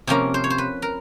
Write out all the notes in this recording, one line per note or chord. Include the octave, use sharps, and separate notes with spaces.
C3 F3 A#3 C#4 A#4
C5
C#5
C5
B4
A#4